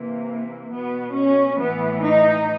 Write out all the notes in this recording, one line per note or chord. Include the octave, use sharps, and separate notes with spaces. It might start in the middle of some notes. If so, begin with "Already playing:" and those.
Already playing: C3 E3 A#3
B2 B3
C#4
A2 E3 B3
D#4